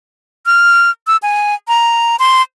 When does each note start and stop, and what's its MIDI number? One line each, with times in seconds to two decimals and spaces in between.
0.46 0.91 89
1.07 1.17 88
1.22 1.55 80
1.68 2.16 82
2.19 2.42 84